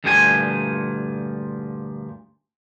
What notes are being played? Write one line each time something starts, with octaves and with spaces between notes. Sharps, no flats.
D2 G2 A#2 F3 G5 G#5